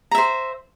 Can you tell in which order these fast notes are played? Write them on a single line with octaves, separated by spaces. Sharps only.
A#5 E5 C5